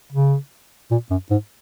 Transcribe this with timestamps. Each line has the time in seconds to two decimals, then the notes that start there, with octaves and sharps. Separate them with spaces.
0.12 C#3
0.91 A#2
1.10 F#2
1.30 G#2